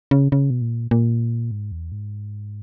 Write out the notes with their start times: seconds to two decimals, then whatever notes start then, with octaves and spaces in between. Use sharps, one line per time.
0.11 C#3
0.32 C#3
0.50 B2
0.61 A#2
0.91 A#2
1.51 G#2
1.72 E2
1.92 G#2